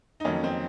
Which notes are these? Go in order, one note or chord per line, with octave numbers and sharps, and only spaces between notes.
D#4
F2 D#3 F#3 A#3 C#4
C4 D#4